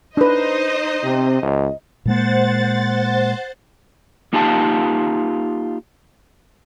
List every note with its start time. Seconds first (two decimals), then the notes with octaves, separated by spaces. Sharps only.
0.17 D4 D#4 B4 C5 D#5
1.04 C3 C4
1.43 C#2 D#5
2.05 A#2 G#3 A#3 C5 F#5 A6
4.33 A#3 D#4 F4 G4 G5 A5